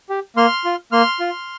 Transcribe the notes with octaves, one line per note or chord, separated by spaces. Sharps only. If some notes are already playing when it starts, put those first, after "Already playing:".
G4
A#3 C6 F6
F4
A#3 C6 F6
F4